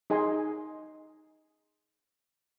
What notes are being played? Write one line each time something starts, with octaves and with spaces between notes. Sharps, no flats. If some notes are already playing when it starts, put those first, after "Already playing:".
D#4 G#4 D#5 G#5 C6 D#6